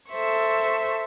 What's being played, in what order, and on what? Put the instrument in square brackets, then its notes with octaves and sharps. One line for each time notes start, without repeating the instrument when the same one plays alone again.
[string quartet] A4 C5 E5 C#6